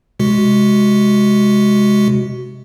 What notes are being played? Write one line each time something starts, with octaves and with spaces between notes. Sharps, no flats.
C3 G#3 F#4